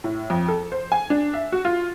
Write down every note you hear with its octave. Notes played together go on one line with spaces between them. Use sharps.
A2
F2
A4
C5
G#5
D4
E5
F#4
F4